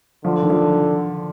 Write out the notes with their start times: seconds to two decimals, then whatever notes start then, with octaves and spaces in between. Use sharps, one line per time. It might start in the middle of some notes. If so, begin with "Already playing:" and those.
0.24 D3 F3
0.43 D#3
0.50 F3